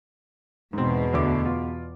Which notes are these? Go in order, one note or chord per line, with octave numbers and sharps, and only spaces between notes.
E2 G#2 B2 C4
D2 D3 D6
F4